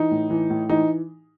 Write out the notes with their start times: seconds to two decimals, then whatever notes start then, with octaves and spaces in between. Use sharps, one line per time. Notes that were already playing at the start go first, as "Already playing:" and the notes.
Already playing: E3 D#4
0.11 A2
0.30 E3
0.50 A2
0.69 E3 D#4